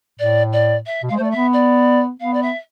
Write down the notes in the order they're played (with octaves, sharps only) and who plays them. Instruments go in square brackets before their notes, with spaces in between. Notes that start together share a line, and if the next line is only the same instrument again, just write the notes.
[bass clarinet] A2 [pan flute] D5
[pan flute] D5
E5
[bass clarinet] B2
[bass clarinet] G#3 [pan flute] F5
[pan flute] C5
[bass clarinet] A3 [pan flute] D5
[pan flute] E5
[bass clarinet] B3
[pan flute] D5
[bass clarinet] B3 [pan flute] F5
[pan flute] D5
E5